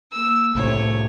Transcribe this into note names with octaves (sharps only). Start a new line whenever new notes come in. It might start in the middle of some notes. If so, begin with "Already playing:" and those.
A#3 E6
C2 A2 C3 A3 C#5